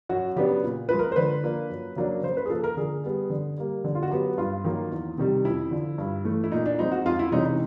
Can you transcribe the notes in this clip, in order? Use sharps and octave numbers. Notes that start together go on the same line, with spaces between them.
F#2 F#4
C#3 F#3 B3 D4 G4
A#2
F3 G#3 B4
A#4
C5
D3 B4
F3 A#3 D4
F#2
C#3 F#3 A#3 D4
C#3 C5
B4
G#4
F3 A#3 A4
A#4
D3 G#4
G3 B3
D3
G3 A#3
D3
F4
F#4
F#3 B3 G4
G2 F4
D#3 F#3 A#3
E2
C3 D#3 G3
F2 E4
D3 F3
G2
E3 A3
E4
A#2 D#4
D4
F3 G#3 C4 D#4
F#4
F2 F4
E4
C3 E3 G#3 C#4 D#4
D#4